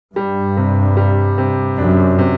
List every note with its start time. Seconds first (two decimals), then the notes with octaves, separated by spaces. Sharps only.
0.15 G2 G3
0.57 C3
0.97 G3
1.38 C3
1.78 F#2 D4
2.19 C3